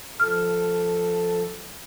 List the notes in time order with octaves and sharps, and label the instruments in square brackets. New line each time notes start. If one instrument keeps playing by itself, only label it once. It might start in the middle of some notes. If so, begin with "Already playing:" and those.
[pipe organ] F3 A4 [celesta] F6